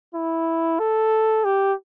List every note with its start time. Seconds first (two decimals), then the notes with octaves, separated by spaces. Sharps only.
0.14 E4
0.79 A4
1.45 G4